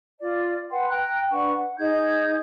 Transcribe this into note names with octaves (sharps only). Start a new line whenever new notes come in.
F4 D5
B4 F#5 G5 C6
G5 A#5 F#6
D4 B4 F#5 C#6
F#5
D#4 G#4 G6 G#6